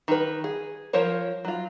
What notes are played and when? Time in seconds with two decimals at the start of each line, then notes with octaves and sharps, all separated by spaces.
0.08 D#3 B4
0.44 G#4
0.93 F3 A#4 C5 C#5
1.45 F#3 F4